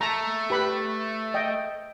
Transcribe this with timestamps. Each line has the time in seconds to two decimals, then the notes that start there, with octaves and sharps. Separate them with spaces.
0.01 A3 A5 A#5
0.50 G4 B4 B5
1.34 D#5 G5